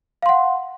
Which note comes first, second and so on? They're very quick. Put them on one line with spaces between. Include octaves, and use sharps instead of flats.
F5 C6 F#5